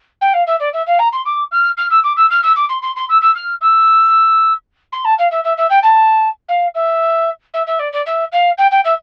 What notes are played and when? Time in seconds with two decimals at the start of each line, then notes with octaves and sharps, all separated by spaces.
0.21 G5
0.33 F5
0.46 E5
0.59 D5
0.73 E5
0.86 F5
0.99 A#5
1.12 C6
1.25 D6
1.51 F6
1.77 F6
1.90 E6
2.03 D6
2.16 E6
2.30 F6
2.43 E6
2.56 D6
2.69 C6
2.82 C6
2.96 C6
3.09 E6
3.21 E6
3.35 F6
3.61 E6
4.92 C6
5.04 A5
5.18 F5
5.31 E5
5.44 E5
5.57 E5
5.69 G5
5.82 A5
6.48 F5
6.74 E5
7.53 E5
7.66 E5
7.79 D5
7.92 D5
8.06 E5
8.32 F5
8.57 G5
8.71 G5
8.84 E5